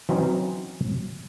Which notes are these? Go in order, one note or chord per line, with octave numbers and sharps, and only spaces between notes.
E3 F#3 C4 C#4 D#4